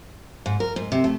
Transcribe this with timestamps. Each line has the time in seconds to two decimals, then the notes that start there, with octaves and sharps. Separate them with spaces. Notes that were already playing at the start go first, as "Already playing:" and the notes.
0.46 G#2
0.60 A#4
0.76 G#2
0.92 C3
1.04 A3